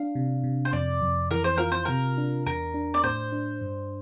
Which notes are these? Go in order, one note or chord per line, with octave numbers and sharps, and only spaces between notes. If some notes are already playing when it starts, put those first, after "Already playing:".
Already playing: D4 F5
C3
C3
C5
F2 D5
F2
E3 A#4
C5
F4 A#4
C5
C3 A#4
D4
E2 A#4
D4
D5
A2 C5
D4
G2